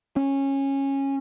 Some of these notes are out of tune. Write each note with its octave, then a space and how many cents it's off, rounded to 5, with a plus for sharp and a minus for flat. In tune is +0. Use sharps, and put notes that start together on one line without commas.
C#4 -15